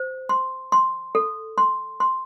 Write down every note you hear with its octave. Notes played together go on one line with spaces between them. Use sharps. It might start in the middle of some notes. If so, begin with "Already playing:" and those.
Already playing: C5
C6
C6
A4
C6
C6